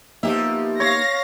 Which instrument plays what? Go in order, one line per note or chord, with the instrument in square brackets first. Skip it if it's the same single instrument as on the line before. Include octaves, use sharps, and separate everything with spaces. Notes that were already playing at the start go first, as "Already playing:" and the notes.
[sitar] F3 G4 E5 [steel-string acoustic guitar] A#3 B3 D#4
[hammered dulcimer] C#5 [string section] F5 A#6